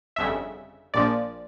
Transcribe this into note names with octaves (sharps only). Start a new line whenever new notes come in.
G1 F2 C#3 E5
A#1 A#2 F3 D5